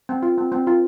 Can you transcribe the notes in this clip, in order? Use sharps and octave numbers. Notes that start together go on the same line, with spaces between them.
C4
F4
C4
C4
F4